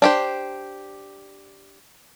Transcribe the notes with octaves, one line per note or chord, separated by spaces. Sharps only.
D4 G4 C5